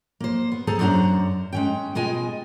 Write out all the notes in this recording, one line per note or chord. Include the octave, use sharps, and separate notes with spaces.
A#3 C5
B3
G#4 A4 C5 A5 A#5
F#2 D4 C5 F#5 A#5
G#3 C#4 G5
B2 G#3 F4 D#5 G#5